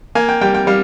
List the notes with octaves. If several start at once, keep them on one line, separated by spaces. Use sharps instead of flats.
A#3 G#5
G5
G3 G5
G5
G3 F5